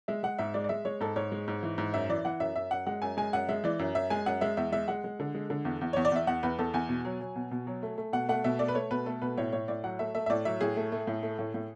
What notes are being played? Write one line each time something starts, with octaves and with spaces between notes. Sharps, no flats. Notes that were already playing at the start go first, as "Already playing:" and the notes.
G#3 E5
G#3 F#5
G#2 E5
G#3 D5
D5
G#3 E5
G#3 C#5
G#2 A4
G#2 C#5
G#3
G#2
E3
G#2
F#2 E5
E3 D5
E3 F#5
F#2 E5
F#2 E5
F#2 F#5
G#3 F#5
F#2 G#5
G#3 G#5
F#2 F#5
G#3 E5
E3 D5
F#2
F#2 E5
G#3 G#5
F#2 F#5
G#3 E5
E2 E5
G#3 E5
G#3 F#5
G#3
D3
G#3
D3
E2
E2
E2 C#5
D5
E2 E5
E2 F#5
E2 B4
E2 A4
E2 G#5
B2
F#3
F#3
B2
B2
F#3
A3
A3
B2 F#5
A3 F#5
B2 E5
A3 D5
B4
A3 C#5
B2 B4
A3 A4
B2 B4
A2 C#5
A2 C#5
A2 D5
F#3 F#5
A3 E5
A3 E5
E5
A2 D5
F#3 E5
A2 G#4
A3
A3
A2
A3
A2
A2